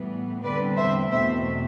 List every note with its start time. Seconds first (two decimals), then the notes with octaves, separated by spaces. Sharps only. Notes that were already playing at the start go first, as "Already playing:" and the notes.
Already playing: A2 E3 G3 B3
0.43 E2 D3 G3 C4 B4 D5
0.76 C5 E5
1.10 E2 B2 A3 C4 C5 E5